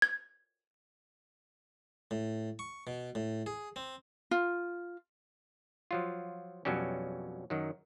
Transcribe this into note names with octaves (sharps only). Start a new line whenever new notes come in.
G#6
A2
C#6
B2
A2
G#4
C4
F4
F3 F#3 F4
F2 B2 F#3 G3 C#4
F#2 D#3 F#3